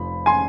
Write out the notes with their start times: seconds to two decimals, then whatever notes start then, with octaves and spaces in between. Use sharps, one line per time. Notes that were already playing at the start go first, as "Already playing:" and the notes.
Already playing: F1 F3 B5
0.26 G#5 C6